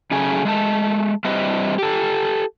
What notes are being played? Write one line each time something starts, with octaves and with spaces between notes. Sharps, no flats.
F#2 C#3 A3 G#4 G#5
G#3 A3 A5
G3 C4 D4 E4 B4 D#5
G4 A4